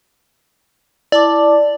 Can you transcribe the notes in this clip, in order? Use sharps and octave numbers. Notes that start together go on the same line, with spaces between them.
E4 D5 A5 D6